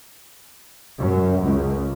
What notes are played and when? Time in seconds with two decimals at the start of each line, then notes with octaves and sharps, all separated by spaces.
0.99 F#2
1.41 C#2